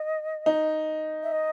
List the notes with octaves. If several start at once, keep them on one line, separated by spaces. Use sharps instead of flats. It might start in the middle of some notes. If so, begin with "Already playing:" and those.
Already playing: D#5
D#4
E5
D#5